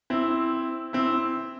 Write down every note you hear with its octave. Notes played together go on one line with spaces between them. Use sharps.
C4 E4
C4 E4